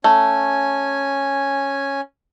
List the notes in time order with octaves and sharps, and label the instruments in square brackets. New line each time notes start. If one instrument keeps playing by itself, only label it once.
[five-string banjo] A3 [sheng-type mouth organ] C#4 G#5